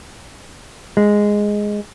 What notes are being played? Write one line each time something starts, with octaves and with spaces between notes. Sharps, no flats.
G#3